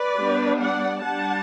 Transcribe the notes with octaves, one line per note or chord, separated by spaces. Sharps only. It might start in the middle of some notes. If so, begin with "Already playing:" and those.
Already playing: B4 D5
G3 B3 D4
D5 F#5
G3 D4 F#5 A5